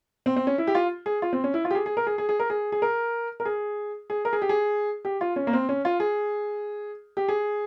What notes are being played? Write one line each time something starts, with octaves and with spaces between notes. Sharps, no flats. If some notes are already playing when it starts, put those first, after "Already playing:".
C4
C4
C#4
E4
G4
F4
G#4
F4
C4
C#4
E4
F4
G4
G#4
G#4
A#4
G#4
G#4
G#4
A#4
G#4
G#4
A#4
A#4
G#4
G#4
A#4
G#4
G4
G#4
G4
F4
C#4
A#3
C4
C#4
F4
G#4
G4
G#4